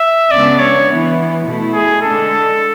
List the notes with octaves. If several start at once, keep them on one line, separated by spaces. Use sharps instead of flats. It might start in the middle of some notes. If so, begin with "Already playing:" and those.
Already playing: E5
C#3 G#3 B3 D4 D5
C#5
E3 B3 E4
B2 A3 E4
G#4
D3 G#3 D4 A4